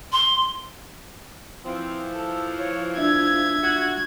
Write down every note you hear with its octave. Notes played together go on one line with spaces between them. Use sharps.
C6
E3 F3 C4
A4
C#5
D4 F4 E5 G#6
F#4